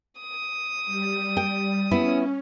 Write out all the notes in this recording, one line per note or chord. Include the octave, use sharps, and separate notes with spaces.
D#6
G3
G5
B3 C#4 E4